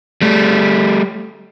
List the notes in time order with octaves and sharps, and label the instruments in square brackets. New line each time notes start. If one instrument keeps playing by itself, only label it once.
[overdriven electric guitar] G3 A3